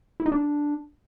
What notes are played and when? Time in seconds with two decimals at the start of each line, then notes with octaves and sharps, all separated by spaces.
0.20 E4
0.26 D#4
0.32 D4